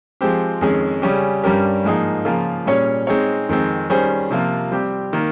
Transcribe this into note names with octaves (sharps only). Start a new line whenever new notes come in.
F3 G#3 C4 G4 C5
F2 D#3 G#3 C#4 G#4
C#3 G3 C#4 G4
G2 G3 C#4 G4 A#4
G#2 F3 A#3 D#4 G#4
C#3 F3 A#3 F4 A#4
A#2 G3 C#4 G#4 C#5
G#3 C4 D#4 G#4 C#5
F2 D#3 G#3 C4
D#3 G3 C#4 G#4 C5
C3 F3 A#3 F4
G3 C4 G4
D#3 A#3